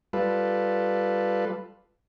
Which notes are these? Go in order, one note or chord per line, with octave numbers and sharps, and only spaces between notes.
G3 F4 A4 B4